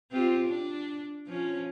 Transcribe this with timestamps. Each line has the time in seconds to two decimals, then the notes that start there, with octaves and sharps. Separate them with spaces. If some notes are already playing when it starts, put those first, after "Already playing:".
0.11 C4 F4 G4
0.46 D4
1.27 F3 C#4